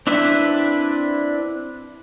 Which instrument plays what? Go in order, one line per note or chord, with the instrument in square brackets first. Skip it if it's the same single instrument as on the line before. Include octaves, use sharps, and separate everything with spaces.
[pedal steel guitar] C4 D4 E4 B4 E5